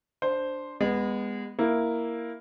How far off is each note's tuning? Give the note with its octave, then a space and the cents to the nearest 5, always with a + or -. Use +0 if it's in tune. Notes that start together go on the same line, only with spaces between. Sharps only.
D4 +0 C5 +0
G#3 -25 B3 +0
A#3 +0 E4 +0